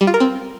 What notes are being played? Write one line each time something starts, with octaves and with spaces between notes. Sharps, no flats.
G3
F4
A#4
C4